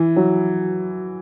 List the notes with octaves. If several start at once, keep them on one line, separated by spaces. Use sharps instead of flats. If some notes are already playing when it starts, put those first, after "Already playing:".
Already playing: E3
F#3